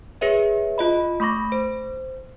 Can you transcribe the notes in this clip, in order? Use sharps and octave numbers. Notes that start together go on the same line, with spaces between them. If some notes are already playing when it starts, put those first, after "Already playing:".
G#4 B4 C#5 E5
F4 D#5 B5
A3 B5 C#6 D6 A#6
C5